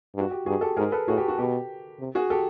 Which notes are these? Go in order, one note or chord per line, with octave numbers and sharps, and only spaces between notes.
G2
F#4
G4
G2 F#4 G#4
G4 A4
G#2 G#4 A#4
A4 B4
A2 F#4 G#4
G4
F#4
B2 G4
C3
F#4 G#4
G4 A4